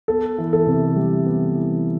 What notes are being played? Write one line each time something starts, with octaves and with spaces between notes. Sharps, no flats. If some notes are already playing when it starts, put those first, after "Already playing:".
B3 A4
E3
A4
C3
G3
B3
E3